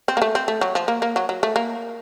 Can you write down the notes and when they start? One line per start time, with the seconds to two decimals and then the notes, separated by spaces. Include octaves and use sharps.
0.08 C4
0.17 A#3
0.22 A3
0.35 C4
0.48 A3
0.61 F#3
0.75 F3
0.88 A#3
1.02 A#3
1.16 F#3
1.29 F#3
1.43 A3
1.56 A#3